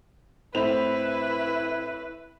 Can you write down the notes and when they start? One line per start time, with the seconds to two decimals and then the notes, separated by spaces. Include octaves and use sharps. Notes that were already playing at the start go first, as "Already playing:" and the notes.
0.55 A2 C4 E4 B4 F7